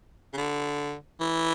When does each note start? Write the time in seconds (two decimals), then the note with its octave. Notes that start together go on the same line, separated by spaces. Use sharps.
0.33 C#3
0.37 D3
1.21 E3